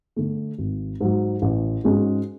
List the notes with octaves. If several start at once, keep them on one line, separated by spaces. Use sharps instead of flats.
D3 A3
G#1
G#2 F#3
A1
G#2 G#3 C#4 F#4